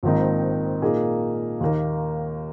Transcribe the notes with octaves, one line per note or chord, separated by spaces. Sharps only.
A#1 G#2 D#3 C4 D#4
A#2 A#3 D#4 G#4
D#2 D#3 A#3 D#4